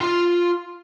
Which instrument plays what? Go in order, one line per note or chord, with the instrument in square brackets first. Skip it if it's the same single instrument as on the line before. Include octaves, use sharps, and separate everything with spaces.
[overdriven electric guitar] F4 F5